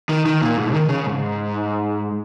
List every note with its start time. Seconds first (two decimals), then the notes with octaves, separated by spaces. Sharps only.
0.09 D#3
0.26 D#3
0.42 A#2
0.57 G#2
0.73 D#3
0.89 C#3
1.06 G#2